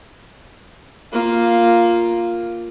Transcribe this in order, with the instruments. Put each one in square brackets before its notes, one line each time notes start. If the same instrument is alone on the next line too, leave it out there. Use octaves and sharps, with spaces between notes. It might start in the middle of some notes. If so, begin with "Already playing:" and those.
[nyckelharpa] A#3 F4